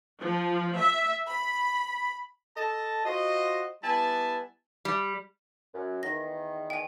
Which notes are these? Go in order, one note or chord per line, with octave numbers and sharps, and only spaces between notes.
F3
E5
B5
A4 D#5 A5
F4 F#4 C5 D#5
G3 B3 E4 G#5 A5
G3
F#2
E2 D#3 A#6
G5 G#5